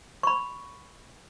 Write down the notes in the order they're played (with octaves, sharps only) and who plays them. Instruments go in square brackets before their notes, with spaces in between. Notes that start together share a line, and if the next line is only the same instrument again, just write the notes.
[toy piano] B5 C#6